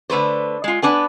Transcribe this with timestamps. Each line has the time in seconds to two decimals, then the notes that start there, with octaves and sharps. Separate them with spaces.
0.10 D3 A3 B4 C5
0.64 G#3 F4
0.82 B3 D4 B4 G#5